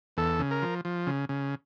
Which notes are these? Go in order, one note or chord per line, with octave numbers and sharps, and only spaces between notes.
E2 A4
C#3
A#4
F3
F3
C#3
C#3